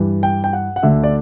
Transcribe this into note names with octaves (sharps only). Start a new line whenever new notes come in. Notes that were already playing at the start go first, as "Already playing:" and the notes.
Already playing: G2 E3
G5
G5
F#5
F#5
D2 D3 E5
D5